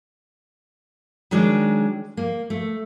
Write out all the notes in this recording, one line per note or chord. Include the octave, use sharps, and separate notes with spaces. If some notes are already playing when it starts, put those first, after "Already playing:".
D#3 F#3 G#3 D4
A#3
A3